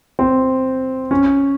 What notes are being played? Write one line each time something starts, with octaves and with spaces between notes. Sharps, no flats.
C4
C#4